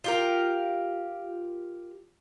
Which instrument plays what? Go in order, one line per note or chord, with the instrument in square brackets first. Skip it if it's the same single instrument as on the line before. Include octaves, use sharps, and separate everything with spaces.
[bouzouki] F4 G4 A#4